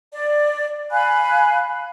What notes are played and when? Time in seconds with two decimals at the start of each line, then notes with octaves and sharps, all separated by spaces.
0.13 D5
0.91 F5 G#5 B5 F#6